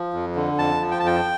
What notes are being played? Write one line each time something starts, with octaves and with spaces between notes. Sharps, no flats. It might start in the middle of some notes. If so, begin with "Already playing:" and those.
Already playing: F3
F2
D3
F2 A5
F3
G5
A5
F2 G5